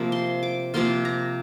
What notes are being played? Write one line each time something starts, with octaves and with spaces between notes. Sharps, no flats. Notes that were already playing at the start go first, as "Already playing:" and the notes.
Already playing: C3 F3 A#3 F4 A#5
C6
D6
C3 F3 A#3 F4 C6
A#5